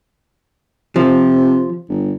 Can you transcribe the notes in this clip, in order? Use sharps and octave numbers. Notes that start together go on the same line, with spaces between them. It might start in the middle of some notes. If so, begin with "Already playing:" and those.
C3 F3
G1